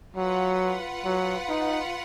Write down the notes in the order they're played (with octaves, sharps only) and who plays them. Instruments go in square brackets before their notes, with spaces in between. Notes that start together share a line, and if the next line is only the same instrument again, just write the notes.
[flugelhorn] F#3 [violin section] F4 B4 F#5
[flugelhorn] F#3
D#4